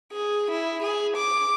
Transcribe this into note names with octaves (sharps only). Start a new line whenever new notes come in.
G#4
E4
G#4
D6